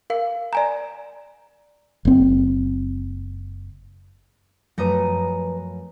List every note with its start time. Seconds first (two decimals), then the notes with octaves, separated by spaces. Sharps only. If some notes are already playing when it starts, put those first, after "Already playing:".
0.10 A#4 F5
0.53 D5 G#5 A#5
2.05 F#1 C4
4.78 F#2 F3 A3 B4 A#5 D#6